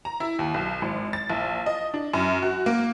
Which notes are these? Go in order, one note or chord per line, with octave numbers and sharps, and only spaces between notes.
A#5
E4
D#2
B1
G#1
A6
A#1
D#5
D4
F#2
F#4
A#3